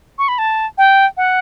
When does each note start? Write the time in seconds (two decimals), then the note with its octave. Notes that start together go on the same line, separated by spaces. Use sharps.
0.19 C#6
0.28 B5
0.38 A5
0.78 G5
1.17 F#5